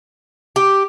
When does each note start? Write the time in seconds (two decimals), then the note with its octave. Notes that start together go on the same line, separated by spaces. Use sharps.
0.56 G4